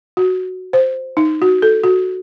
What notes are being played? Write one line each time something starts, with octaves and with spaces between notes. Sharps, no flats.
F#4
C5
D#4
F#4
A4
F#4